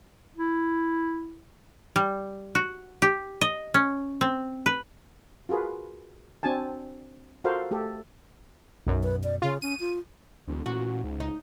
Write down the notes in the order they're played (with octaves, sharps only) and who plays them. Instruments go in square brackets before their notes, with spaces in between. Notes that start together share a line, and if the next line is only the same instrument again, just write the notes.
[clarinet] E4
[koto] G3
F#4
G4
D#5
C#4
C4
B4
[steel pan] F4 F#4 G#4 A#4 B4
C4 D4 F#4 G#5 A5
F4 F#4 A4 A#4 C5 F5
A3 G4 A4
[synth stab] B1 F#2
[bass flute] B4
D5
[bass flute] C#3 [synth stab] F4
[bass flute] C#4 [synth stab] D#7
[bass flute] F4
[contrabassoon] E1 [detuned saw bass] D2
[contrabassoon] A1 [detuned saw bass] A#2 [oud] F#4
[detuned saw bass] C#2 [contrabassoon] G#2
[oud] D#4